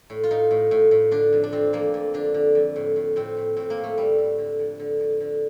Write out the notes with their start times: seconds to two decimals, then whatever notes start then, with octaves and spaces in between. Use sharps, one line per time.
0.10 A2
0.24 F4
0.31 A2 D#4
0.51 A2
0.71 A2
0.91 A2
1.11 D3 D4
1.33 F2
1.44 D4
1.53 F2 C4
1.73 F2 A#3
1.94 F2
2.14 D3 D4
2.34 D3
2.55 F2
2.76 A2
2.96 A2
3.16 A2 C4
3.37 A2
3.57 A2 C4
3.70 A#3
3.78 A2
3.84 A3
3.98 A2 G3
4.18 A2
4.38 D3
4.59 F2
4.79 D3
5.00 F2
5.20 D3